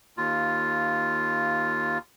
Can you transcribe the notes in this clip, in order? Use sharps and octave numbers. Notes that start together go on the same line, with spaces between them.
D#2 F4